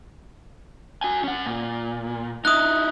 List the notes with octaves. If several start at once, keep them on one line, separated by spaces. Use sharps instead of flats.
F#4 G#5
C#4 F#5
A#2
D#4 E4 D#6 F#6